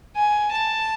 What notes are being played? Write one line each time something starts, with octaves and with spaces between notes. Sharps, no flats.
G#5
A5